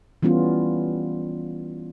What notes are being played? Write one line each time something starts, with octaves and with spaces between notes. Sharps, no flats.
E3 G3 B3 C#4 F4